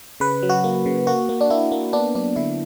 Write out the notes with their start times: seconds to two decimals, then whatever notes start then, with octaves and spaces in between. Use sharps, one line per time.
0.20 C#3 B4
0.43 F#3
0.50 F#4
0.64 A#3
0.86 C#3
1.07 A#3 F#4
1.29 A#3
1.41 D4
1.50 A#3 E4
1.72 A#3
1.93 B3 D4
2.15 F#3 D4
2.36 D3 E4